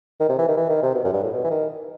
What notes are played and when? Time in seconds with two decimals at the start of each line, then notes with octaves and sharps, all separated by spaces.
0.20 D#3
0.29 C3
0.38 E3
0.48 D#3
0.57 E3
0.69 D#3
0.83 C3
0.94 B2
1.04 F#2
1.13 G2
1.23 A2
1.33 B2
1.44 E3
1.50 D#3